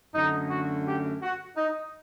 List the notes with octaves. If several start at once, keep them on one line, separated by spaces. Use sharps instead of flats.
F#2 D3 A3 D#4
F#4
G4
F#4
D#4